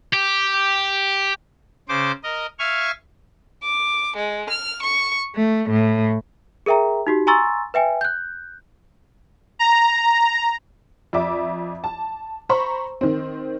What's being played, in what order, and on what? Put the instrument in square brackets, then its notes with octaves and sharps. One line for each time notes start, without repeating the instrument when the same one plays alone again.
[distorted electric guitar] G4
[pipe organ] C#3 C5 D6
A#4 D#5
E5 F5 G#5 C#6 F6
[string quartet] D6
G#3
F6
C#6
A3
A2
[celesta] G#4 A#4 E5 G5 A#5
D#4 F#4 G4
G#5 A#5 C6 C#6 E6 A6
B4 E5 G5 G#5
F#6 G6
[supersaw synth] A#5
[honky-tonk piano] F2 D5 E5 D6
A5
C5 A#5 B5 C#6
D#3 C4